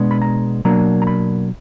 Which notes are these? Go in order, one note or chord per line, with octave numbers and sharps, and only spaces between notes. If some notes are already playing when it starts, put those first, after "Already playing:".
Already playing: B2 G#3 B3 D4
B5
A#5
B2 F#3 A#3 D4 A#5
A#5
B5